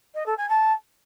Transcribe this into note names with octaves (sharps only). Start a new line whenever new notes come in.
D#5
A4
G#5
A5